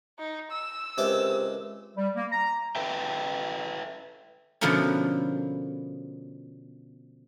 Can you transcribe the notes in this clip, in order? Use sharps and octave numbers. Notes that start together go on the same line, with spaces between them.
D#4
E6
C#2 C3 A#4 B4 D#5 E5 D6
G3
A#3
A#5
A4 B4 E5 G5
B2 D3 F3 A3 A#3 C#4